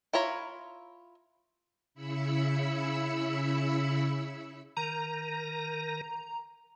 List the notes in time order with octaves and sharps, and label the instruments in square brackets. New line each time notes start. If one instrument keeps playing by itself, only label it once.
[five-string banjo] E4 F4 C#5 A#5
[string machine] C#3 E4 B5 E6 C#7
[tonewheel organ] D#3 A#4 [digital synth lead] A#5